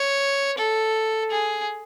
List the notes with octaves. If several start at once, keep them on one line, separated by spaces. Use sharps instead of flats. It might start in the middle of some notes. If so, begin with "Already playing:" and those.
Already playing: C#5
A4
G#4